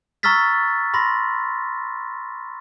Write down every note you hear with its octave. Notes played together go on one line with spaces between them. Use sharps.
A#5 C#6 E6 F6 A6 B6
B5 C6 A#6